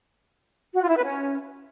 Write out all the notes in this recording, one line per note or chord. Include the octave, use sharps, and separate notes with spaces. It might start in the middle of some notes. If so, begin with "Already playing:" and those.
F#4
F4
E4
B4
C#4